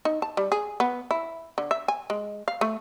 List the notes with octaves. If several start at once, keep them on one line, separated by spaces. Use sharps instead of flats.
D#4
A5
G3
G#4
B3
E4
D3
E5
G#5
G#3
F5
A3